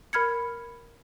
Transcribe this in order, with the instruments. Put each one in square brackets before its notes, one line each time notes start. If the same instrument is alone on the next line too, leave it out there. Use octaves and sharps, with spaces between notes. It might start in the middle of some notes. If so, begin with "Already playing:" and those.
[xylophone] A#4 B5 F6 G#6 C#7